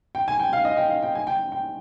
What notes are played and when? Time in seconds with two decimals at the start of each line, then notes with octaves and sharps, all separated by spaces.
0.15 G5
0.28 G#5
0.40 G5
0.53 F5
0.65 D#5
0.77 G5
0.90 F5
1.02 G5
1.15 G#5
1.27 G5
1.52 G5